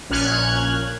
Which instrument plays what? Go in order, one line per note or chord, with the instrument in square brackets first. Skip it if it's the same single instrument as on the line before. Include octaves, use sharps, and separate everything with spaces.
[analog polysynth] A#1 A#2 C#4 F6 F#6 G#6